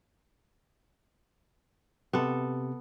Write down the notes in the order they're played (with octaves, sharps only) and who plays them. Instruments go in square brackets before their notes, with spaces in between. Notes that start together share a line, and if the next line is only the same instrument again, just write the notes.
[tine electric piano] C3 [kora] B3 A4